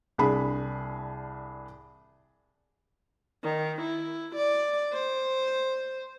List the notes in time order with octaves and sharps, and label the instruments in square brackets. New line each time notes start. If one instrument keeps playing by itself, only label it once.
[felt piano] C2 D4 G#4 B5
[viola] D#3
E4
D5
C5